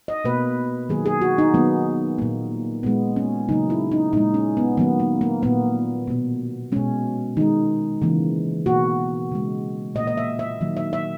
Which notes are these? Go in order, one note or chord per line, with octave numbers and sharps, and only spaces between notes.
D#5
B2 A#3 B4
D#3 F#3 A#3 G#4
G#4
F#4
D#4
D#3 F#3 A#3 B3
A#2 A#3
A#2 G#3 B3
C#4
C#3 F#3 A#3 D#4
E4
D#4
A#2 G#3 D#4
C#4
B3
D#3 F#3 A#3 B3
A#3
A#3
A#2 A#3 B3
B2 A#3
B2 G#3 C#4
D#3 G#3 D#4
C#3 E3 A#3
B2 A#3 F#4
C#3 G#3
A#2 A#3 D#5
D#5
E5
E5
D#3 F#3 A#3
E5
E5